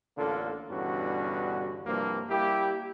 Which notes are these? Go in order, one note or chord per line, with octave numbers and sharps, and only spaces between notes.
A1 D3 A#3 D4 F4 A4
E2 G2 B2 D3 C#4 F#4
C2 G2 F3 A#3
G3 A#3 E4 G4